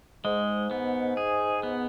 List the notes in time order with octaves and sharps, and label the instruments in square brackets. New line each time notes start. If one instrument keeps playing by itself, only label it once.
[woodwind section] G#2 [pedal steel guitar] G#3
[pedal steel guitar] B3
G#4
B3